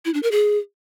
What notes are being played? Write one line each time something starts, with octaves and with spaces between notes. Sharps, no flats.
E4
D4
A#4
G#4